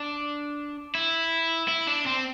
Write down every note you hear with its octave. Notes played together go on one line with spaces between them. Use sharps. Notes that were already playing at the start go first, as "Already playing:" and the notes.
Already playing: D4
E4
E4
D4
C4